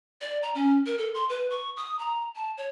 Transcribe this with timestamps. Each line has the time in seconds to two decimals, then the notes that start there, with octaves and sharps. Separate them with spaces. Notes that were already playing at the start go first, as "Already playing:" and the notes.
0.21 D5
0.43 A#5
0.55 C#4
0.86 A#4
0.98 A4
1.14 C6
1.29 B4
1.50 C#6
1.77 D#6
1.99 A#5
2.36 A5
2.58 C#5